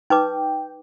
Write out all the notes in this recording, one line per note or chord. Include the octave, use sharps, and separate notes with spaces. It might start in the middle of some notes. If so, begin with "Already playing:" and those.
D#4 B4 G5 D6